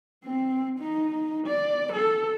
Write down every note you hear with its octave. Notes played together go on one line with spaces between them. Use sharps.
C4
D#4
D5
A4